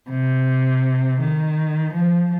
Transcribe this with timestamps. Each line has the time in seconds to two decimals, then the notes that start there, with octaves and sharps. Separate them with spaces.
0.10 C3
1.20 D#3
1.94 F3